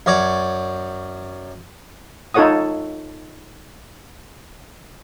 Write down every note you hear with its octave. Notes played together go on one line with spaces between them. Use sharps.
F#2 C#5 D5
D#4 F4 A4 C#5 F#5 D#6